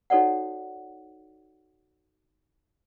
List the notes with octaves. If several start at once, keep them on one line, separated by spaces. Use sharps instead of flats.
D#4 F#4 A4 C#5 D5 F#5